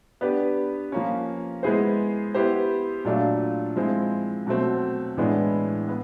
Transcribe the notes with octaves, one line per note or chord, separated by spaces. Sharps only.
B3 D4 G4 B4
F3 A#3 C#4
G#3 B3 E4 G#4 C5
B3 E4 G4 C5
A#2 F#3 A3 D4 F4
F3 G#3 C4 E4
B2 F#3 A3 C4
A2 E3 G#3 B3 D4
B3